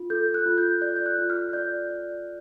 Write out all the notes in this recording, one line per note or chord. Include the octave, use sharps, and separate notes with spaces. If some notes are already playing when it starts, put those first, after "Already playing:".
Already playing: F4
A4 G6
F#6
F4
G6
D5 G6
G6
F#6
F4
F6
D5 G6
D5